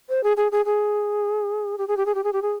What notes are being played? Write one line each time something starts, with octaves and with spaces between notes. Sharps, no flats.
C5
G#4
G#4
G#4
G#4
G4
G#4
G4
G#4
G4
G#4
G4
G#4